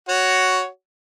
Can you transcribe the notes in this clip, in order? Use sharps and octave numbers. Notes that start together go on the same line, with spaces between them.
F#4 C#5